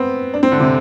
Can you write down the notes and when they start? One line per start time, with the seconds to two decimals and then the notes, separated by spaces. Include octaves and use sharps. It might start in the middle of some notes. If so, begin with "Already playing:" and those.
Already playing: B3 C4
0.34 D4
0.43 C4
0.52 D3
0.60 C3